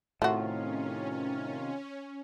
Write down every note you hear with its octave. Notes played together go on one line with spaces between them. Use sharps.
A2 C3 D#3 A3 C#4 F4 F#4